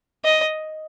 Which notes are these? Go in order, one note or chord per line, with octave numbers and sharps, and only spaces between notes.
D#5